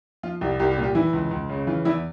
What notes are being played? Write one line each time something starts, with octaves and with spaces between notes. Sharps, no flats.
F3 F4
C2 G4
C2 G4
G4
A#2
G4
E3 E4
C#2
C#2
C#3
E3 F4
E2 E4